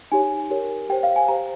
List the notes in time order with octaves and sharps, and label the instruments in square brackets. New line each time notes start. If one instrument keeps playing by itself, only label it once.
[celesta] D#4 G4 C#5 G#5
G4 A#4 C#5
G4 C5 G5
F5
G#5
G4 C5 A#5